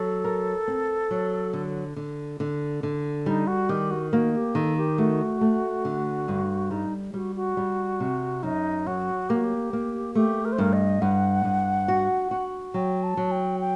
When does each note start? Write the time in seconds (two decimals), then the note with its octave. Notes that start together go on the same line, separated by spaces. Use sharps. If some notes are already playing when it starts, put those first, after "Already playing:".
Already playing: F#3 A4
0.24 A#4
0.68 C4
1.11 F#3
1.53 D3
1.96 D3
2.40 D3
2.83 D3
3.26 G3 D#4
3.47 F#4
3.69 D#3 G4
3.91 F#4
4.12 A#3 F#4
4.34 G4
4.55 D#3 A4
4.77 G4
4.98 A3 F#4
5.41 A3
5.85 D3
6.28 G2
6.70 G3 D#4
7.14 G3 F#4
7.36 F#4
7.57 G3
8.00 C3
8.43 F#2 D#4
8.87 F#3 F#4
9.29 A#3 G4
9.37 F#4
9.44 G4
9.73 A#3
10.15 A3 G4
10.45 A#4
10.53 C5
10.58 G2 A#4
10.73 D#5
11.02 G2 F#5
11.45 G2
11.88 F#4
12.31 F#4
12.74 F#3 G5
13.03 A5
13.17 F#3
13.32 G5
13.60 G5